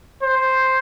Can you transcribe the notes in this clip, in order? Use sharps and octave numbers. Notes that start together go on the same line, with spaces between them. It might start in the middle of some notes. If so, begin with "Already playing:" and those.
C5